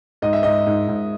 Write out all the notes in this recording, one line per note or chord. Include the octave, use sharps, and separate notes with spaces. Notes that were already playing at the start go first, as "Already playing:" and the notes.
G#2 D#5
E5
G#2 D#5
G#2
G#2